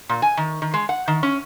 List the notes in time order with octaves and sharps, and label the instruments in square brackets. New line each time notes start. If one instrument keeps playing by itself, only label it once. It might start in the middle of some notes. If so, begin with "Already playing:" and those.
[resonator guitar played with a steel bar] A#2
G#5
D#3
D#3
G#3
F#5
D#3
C#4